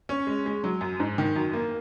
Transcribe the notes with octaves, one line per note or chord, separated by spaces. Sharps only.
C#4
G#3
G#3
F#3
F#2
G#2
D#3
F#2
A#3